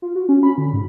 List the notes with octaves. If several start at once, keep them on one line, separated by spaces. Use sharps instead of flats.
F4
F#4
C#4
B5
D3
G#2